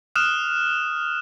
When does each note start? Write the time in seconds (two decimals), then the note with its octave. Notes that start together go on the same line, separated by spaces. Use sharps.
0.16 D#6 F6 F#6 E7